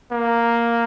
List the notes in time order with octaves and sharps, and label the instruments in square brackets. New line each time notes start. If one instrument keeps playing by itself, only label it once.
[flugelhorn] A#3